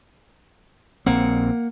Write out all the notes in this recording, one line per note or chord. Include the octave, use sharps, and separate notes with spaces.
A#1 A#3 C4 F#5